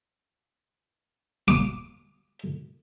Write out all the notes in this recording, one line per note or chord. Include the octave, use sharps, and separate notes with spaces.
D6